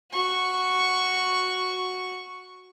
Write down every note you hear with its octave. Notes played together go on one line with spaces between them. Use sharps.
F#4 C#6